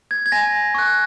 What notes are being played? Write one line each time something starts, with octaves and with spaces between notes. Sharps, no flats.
G#6
G#6
G#5 A#6
C#6 F#6